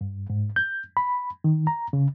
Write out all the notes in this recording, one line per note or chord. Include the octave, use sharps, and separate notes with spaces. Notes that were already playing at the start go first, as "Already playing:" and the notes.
G2
G#2
G6
B5
D#3
A#5
C#3